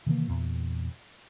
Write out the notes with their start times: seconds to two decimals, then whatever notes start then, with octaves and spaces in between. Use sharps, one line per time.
0.07 C3 D#3 E3 A#3
0.28 E2 A#2